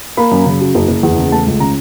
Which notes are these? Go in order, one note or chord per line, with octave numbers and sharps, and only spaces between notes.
A#3 B5
F#2
C#3
F#3
F#1
F#1
E2
C#3
A3 A5
C#2
C#3 A#5